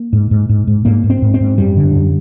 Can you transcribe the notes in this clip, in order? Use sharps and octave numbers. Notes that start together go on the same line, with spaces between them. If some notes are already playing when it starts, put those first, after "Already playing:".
Already playing: A#3
G#2
G#2
G#2
G#2
G#2 A#3
G#2
C4
G#2
C4
G#2
F#2 G3
D3
F#2